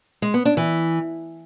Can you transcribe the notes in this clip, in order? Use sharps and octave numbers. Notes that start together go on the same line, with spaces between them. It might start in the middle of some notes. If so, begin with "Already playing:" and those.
G#3
B3
D4
E3